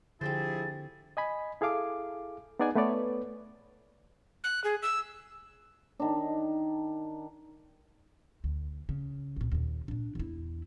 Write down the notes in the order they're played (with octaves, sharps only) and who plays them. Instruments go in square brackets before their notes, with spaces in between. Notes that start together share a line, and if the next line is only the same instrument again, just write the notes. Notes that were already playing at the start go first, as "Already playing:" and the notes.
[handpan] D3 [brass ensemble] F3 E4 G#4 [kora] C4 G4 C5 [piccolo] A6
[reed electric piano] D#5 G#5 B5
E4 G#4 A4 F5 D6
B3 D#4 G#4 D5 F#5 G#5
A3 B3 B4 C#5 D5
[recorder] F#6
G#4
E6
[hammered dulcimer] D#3 D4
[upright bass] D2
C#3
C2 A#2
D#2 A#2
A#2 D4
E2 E4